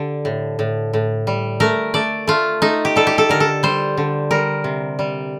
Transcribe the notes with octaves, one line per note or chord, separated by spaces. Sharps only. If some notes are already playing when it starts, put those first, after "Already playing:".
Already playing: D3 G4
A2
A2
A2
G3
A3 A#4
A3 D5
A3 F4
A3 D#4
G4
G3 A4
G4
A4
D3 A#4
A4
G3 C5
D3
G3 A#4
C3
G3